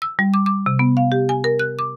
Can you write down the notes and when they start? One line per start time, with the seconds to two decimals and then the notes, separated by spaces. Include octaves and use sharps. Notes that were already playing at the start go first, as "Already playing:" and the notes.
0.02 E6
0.19 G3
0.34 D6
0.46 D6
0.66 C3
0.79 B3
0.97 F5
1.12 G4
1.29 G#5
1.44 A#4
1.59 F#6
1.79 D6